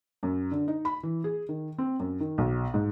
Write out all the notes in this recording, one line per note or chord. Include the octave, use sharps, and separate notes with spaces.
F#2
D3
D#4
B5
E3
G#4
D#3
C4
F#2
D#3
B1
G#2